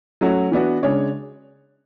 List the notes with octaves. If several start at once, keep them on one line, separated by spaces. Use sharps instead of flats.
F#3 A3 C#4 F#4
E3 B3 D4 F#4
C#3 G#3 D4 G#4 C#5